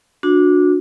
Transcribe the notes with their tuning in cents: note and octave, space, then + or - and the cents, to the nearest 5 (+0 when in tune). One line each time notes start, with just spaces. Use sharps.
D4 +0 F#4 -30